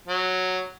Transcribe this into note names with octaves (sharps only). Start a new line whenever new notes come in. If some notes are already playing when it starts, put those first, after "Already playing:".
F#3